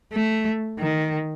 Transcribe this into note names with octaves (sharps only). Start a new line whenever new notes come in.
A3
D#3